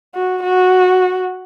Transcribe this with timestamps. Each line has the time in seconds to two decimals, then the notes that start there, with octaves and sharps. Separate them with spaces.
0.15 F#4
0.43 F#4